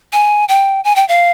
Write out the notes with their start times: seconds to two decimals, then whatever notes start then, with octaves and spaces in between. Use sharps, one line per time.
0.13 G#5
0.48 G5
0.84 G#5
0.96 G5
1.08 F5